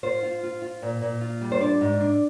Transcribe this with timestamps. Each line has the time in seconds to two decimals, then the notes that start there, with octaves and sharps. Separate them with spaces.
0.03 F4 C5
0.23 F4
0.43 F4
0.62 F4
0.82 A#2
1.02 A#2
1.21 F4
1.41 G3
1.52 C5
1.60 D4 D5
1.81 G#2
2.00 D4